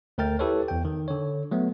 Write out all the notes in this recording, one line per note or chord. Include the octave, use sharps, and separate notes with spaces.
D2 A3 A#4 G5 F6 A6
E4 G4 A4 B4 C#5
E2 G5
D#3
D3 C#5
F#3 A3 B3